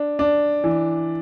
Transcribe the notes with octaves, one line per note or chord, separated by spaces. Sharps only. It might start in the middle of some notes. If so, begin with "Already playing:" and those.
Already playing: D4
D4
E3